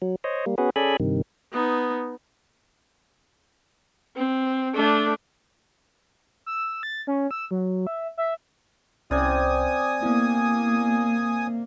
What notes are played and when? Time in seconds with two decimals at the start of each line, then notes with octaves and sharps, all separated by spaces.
0.02 F#3
0.24 C5 C#5 D#5
0.46 G3 A#3
0.58 B3 C#4 F#4 G#4 B4
0.76 C#4 G#4 A4 D5 G#5 B5
1.00 G2 C3 D#3
1.53 B3 D#4
4.16 C4
4.74 A3 D4
6.46 E6
6.83 A6
7.07 C#4
7.31 E6
7.51 F#3
7.87 E5
8.17 E5
9.11 C2 C3 C#4 D5 G#5 D#6 G#6
10.03 A#3 B3 E4